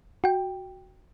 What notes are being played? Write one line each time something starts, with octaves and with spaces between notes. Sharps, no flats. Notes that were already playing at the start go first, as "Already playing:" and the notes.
F#4 G5